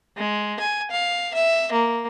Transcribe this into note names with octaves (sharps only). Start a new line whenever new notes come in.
G#3
G#5
F5
E5
A#3